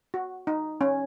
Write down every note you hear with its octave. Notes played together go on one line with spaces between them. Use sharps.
F#4
D#4
C#4